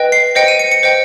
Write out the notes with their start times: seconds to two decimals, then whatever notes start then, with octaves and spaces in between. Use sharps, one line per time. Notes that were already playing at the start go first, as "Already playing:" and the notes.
Already playing: B4 D#5 G5
0.12 C7
0.35 C5 D#5 G5 C#7
0.48 D#7
0.59 C#7
0.72 C#7
0.83 C5 D#5 G5